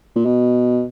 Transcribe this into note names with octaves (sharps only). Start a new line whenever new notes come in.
A#2
B2